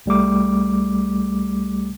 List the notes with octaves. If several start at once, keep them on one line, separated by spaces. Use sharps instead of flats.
C2 G3 A3 D6